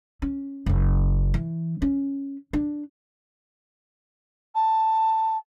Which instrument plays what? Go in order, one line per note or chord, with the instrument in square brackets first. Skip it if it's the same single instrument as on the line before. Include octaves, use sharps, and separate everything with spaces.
[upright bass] C#4
F#1 C#3
E3
C#4
D4
[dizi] A5